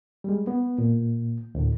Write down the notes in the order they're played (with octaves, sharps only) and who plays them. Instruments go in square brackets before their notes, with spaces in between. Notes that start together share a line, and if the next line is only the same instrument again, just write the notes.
[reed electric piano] G3 G#3
B3
A#2
D2 A2